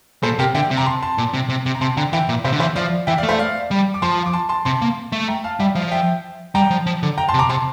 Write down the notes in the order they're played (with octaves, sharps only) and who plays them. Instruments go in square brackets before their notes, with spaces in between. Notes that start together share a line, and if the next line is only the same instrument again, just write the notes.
[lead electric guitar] A#2 [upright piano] A4 C5
[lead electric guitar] C3 [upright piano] G4 A#4
[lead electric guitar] D3 [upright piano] E5 G5
[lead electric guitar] C3
[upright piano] A#5
A5 C6
A5 C6
[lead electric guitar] A#2
C3
C3
C3
[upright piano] A#5
[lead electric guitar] C3 [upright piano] A5 C6
[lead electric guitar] D3 [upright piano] G5 A#5
[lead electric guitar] E3 [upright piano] E5 G5
[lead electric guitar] A#2
[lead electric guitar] C3 [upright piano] C5 E5
[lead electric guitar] D3
[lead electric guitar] E3 [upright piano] C5 E5
[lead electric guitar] F3 [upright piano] D5 F5
[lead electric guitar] E3 [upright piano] E5 G5
[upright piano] D5 F5
[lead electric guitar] A3
[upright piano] C5 E5
D5 F5
[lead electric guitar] G3
[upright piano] D6
[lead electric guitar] F3 [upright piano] A5 C6
[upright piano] D6
A5 C6
A5 C6
[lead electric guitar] C3 [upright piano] A5 C6
[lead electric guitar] A#3
A3
[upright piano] G5 A#5
F5 A5
[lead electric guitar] G3 [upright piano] E5 G5
[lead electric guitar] F3 [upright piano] D5 F5
[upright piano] E5 G5
[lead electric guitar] G3 [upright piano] G5 A#5
[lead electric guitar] F3
F3
D3
[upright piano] G5 A#5
A5 C6
[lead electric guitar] C3
[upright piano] A#5 D6
[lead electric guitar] C3 [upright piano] A5 C6